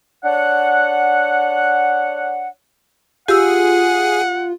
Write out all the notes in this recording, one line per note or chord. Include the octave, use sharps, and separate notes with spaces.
D4 C#5 F#5
F4 G4 G#4 F#5 E6